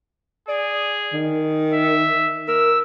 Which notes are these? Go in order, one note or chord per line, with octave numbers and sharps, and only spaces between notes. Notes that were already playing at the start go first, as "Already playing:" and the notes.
G#4 D5
D#3
E5
A#4 E6